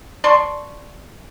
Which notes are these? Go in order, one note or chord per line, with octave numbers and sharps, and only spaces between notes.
D5 A5 C6 C#6